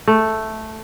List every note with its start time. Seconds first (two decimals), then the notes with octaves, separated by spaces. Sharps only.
0.07 A3